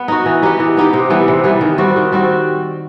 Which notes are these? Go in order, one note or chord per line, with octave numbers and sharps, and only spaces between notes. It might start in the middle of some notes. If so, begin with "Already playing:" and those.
Already playing: B3
D#4 F#4
E3
B3 D#4 G4
E3
B3 D#4 G4
C3
E3 G3 B3
C3
E3 G3 B3
D#3
G3 C4 F#4
D#3
G3 C4 F#4